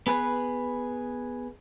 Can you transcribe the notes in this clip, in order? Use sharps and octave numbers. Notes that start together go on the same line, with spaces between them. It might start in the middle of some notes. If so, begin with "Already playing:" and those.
B3 G#4 B4